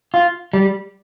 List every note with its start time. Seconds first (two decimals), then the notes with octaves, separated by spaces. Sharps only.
0.14 F4
0.53 G3